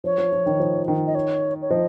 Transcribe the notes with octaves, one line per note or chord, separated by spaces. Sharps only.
F3 C#5
F3
F3
D#3
F3
D#3
D#5
C#5
C#5
F3 D#5